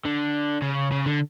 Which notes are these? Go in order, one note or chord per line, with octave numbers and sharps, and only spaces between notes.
D3
C#3
C#3
D3